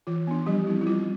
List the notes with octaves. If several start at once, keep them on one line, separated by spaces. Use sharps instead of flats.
E3 F4
B3 D4
F3 G3 G4
C4 E4
E4
G3 F4